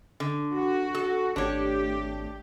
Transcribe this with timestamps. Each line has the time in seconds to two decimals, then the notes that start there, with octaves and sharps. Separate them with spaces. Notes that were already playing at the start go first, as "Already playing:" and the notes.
0.20 D3
0.53 F#4
0.95 A4
1.36 G#1 A3 D4 G4 C#5